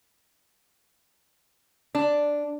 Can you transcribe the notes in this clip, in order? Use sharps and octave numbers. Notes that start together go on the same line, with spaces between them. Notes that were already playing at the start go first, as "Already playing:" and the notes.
D4